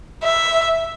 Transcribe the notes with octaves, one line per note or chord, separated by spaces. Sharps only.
E5